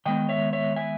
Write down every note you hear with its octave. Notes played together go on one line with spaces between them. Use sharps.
D#3 G#3 B3 D#5 G5
C#5 E5
C#5 E5
E5 G#5